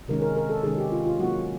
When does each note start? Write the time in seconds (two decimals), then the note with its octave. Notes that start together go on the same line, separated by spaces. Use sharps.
0.08 C3 D#3 G#3 C#4 A#4
0.22 A#4
0.37 A#4
0.50 A4
0.63 C3 D#3 G#3 C#4 G#4
0.78 G4
0.92 F4
1.05 F4
1.19 F#3 A#3 C#4 F#4